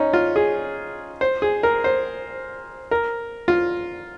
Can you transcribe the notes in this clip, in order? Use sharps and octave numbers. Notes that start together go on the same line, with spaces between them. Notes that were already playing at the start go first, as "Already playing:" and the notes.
Already playing: C#4 D#4
F4
G#4
C5
G#4
A#4
C5
A#4
F4